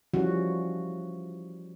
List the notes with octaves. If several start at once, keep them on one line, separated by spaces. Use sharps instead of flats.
E3 F3 G3 C#4 F#4